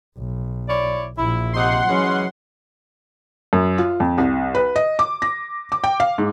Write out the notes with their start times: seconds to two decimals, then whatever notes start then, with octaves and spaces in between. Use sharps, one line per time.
0.18 B1
0.68 E4 C#5 D5
1.18 A#1 E4
1.53 C3 D#4 F#5 C6
1.87 E3 F#3 G#3 C#4
3.53 F#2
3.78 F4
4.00 F2
4.18 C2
4.55 B4
4.76 D#5
4.99 D6
5.22 A#6
5.72 D6
5.84 G5
6.00 F5
6.18 G#2